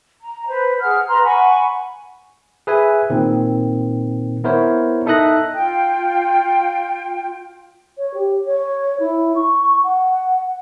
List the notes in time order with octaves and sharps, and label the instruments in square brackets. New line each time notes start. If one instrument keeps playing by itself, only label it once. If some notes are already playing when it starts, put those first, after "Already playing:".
[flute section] A#5
B4 C5
G#4 F#5 F6
B4 A#5 C6
F#5 G#5 B5 C#6
[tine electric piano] G#4 B4 E5 G#5
A#2 D#3 C4
B3 E4 A#4 C5 C#5
D#4 A4 E5 D#6 F#6 A#6
[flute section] F4 G5
[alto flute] C#5
G4
C#5
E4
C#6
F#5